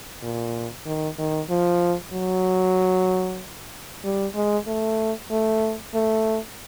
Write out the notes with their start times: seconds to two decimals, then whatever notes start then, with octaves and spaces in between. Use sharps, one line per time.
0.23 A#2
0.86 D#3
1.18 D#3
1.50 F3
2.13 F#3
4.04 G3
4.35 G#3
4.67 A3
5.31 A3
5.95 A3